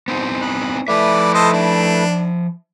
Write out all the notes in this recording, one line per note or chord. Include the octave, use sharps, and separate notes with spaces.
B3 C4 D#4 C5
B5 D#6 F#6
F3 A3 E4 B4 D5 E5
A4 C5 D#5
D4